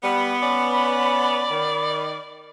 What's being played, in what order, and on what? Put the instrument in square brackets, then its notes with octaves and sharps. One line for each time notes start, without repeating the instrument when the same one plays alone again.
[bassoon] G3 [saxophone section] B3 [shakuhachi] B5
[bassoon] C#4 [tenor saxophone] D5
[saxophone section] D#3